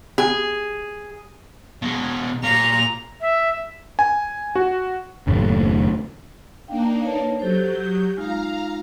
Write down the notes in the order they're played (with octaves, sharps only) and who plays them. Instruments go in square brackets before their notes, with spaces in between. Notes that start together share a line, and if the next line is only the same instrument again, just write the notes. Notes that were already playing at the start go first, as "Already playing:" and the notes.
[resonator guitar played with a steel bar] G#4
[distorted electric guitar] B2 G#3
[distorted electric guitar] A#2 [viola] A#5
[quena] E5
[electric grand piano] G#5
F#4
[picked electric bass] F#1 D#2 A2 A3
[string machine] A#3 D4 D#4 [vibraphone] F5 G5
[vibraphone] B4 C#5 A5
[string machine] F#3 G6 [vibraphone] G4 A4 C5
[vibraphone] G4 D#6
[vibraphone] G#3 D#4 F4 [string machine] F5 A#5